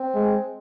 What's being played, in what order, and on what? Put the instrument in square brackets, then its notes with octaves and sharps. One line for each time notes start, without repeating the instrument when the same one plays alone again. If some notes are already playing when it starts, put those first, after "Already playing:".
Already playing: [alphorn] C4
[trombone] G#3